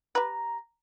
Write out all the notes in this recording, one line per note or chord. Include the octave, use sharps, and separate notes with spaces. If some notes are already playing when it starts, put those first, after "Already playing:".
G3 B4 A#5